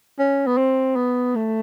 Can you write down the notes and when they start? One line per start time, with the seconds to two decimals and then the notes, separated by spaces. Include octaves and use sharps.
0.19 C#4
0.47 B3
0.57 C4
0.96 B3
1.35 A3